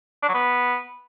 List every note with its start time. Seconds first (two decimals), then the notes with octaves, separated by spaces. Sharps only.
0.23 D4
0.29 F#3
0.34 B3